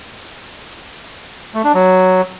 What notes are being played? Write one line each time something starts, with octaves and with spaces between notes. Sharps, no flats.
A3
D4
F#3